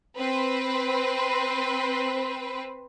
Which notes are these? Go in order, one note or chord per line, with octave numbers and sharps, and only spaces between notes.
C4 B4